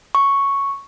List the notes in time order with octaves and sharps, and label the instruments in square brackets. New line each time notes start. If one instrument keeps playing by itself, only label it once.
[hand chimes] C#6